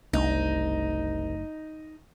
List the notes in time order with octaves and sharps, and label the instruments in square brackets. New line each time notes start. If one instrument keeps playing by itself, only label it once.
[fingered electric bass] F#1 A3 D4 [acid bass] C2 [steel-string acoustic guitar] D#4